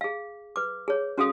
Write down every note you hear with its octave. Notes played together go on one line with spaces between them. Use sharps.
G#4 F5
B4 D6
G#4 C#5
C#4 F#4 G#4 A4 F5 D#6